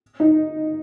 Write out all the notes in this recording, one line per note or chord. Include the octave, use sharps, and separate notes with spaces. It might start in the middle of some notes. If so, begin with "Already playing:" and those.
D#4